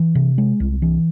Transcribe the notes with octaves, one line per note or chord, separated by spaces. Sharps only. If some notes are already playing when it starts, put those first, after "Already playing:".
Already playing: E3
C3
G#3
C2
E3